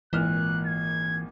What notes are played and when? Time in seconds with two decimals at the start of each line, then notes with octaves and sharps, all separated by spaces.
0.13 G#1 A#2 E3 F6 F#6
0.66 G#6